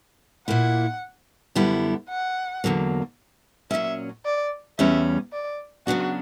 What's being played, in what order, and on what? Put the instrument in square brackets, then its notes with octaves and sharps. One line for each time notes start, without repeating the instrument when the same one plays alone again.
[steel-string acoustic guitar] A#2 A#3 E4 [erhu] F#5
[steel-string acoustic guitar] F#2 D3 G3 B3 E4
[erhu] F#5
[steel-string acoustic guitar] E2 D3 F#3 A#3
[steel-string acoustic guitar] A#2 F#3 C#4 [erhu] E5
[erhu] D5
[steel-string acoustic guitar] E2 C#3 G3 C#4 [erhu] E5
[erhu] D5
[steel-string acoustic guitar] C#3 F#3 B3 D4 [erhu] F#4